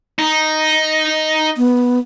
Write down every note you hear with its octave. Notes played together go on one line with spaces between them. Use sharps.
D#4
B3